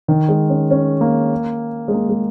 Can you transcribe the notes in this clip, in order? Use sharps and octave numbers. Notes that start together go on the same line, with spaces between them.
D#3
G#3
C#4
C#4
A#3
G#3
A#3
G#3